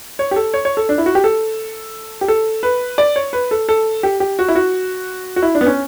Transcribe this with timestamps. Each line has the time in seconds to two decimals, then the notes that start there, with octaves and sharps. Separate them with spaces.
0.19 C#5
0.31 G4
0.36 A4
0.54 C#5
0.65 C#5
0.77 A4
0.89 D4
0.98 E4
1.06 F#4
1.15 G4
1.24 A4
2.21 G4
2.28 A4
2.63 B4
2.98 D5
3.16 C#5
3.33 B4
3.51 A4
3.69 A4
4.03 G4
4.20 G4
4.39 F#4
4.49 E4
4.55 F#4
5.36 F#4
5.43 E4
5.55 D4
5.61 B3
5.67 C#4